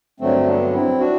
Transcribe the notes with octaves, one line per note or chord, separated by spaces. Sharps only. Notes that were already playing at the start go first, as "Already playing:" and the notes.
G2 D3 F#3 A3 C4
B3 D4
C4 E4
D4 F#4